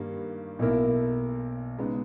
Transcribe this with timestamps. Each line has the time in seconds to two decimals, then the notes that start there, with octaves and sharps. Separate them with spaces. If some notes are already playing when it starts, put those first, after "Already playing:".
Already playing: G2 D#3 G3 A#3
0.59 B1 B2 A#3 E4 A#4
1.78 C#3 G#3 B3 D#4